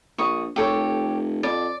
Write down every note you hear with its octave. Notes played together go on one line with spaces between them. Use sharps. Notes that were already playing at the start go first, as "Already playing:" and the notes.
A#1 C#6 D#6
F1 G4 A4 C#5
F2 D5